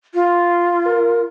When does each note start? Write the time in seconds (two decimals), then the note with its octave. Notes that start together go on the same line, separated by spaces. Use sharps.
0.14 F4
0.86 A#4